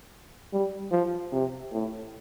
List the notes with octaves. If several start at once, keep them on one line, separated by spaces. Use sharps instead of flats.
G3
F3
C3
A2